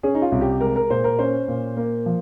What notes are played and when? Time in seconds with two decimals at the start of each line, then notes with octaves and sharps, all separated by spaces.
0.03 C#4 G#4
0.15 D#4
0.22 F4
0.32 C2
0.41 G4
0.61 G#3 A#4
0.76 A#4
0.90 A#2 C5
1.04 A#4
1.19 C#4 C5
1.48 A#2
1.77 A#3
2.06 F3